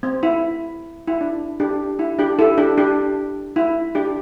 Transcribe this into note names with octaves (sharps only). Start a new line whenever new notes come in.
C4
E4
E4
D4
D4 G4
E4
D4 G4
E4 A4
D4 G4
D4 G4
E4
D4 G4